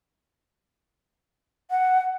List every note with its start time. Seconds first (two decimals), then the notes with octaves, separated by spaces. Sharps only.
1.70 F#5